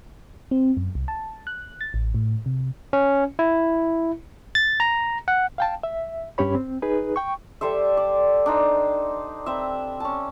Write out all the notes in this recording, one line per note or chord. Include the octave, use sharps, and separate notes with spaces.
C4
F#2
C2
A5
F#6
A6
A1
A2
C3
C#4
E4
A6
A#5
F#5
F5 G5 A5
E5
G2 C#4 G4 C#5 B5
C4
D#4 G#4 B4
G5 C#6
G3 A4 C5 E5
D5
D4 D#4 C5
C4 B4 E5
C#4 A5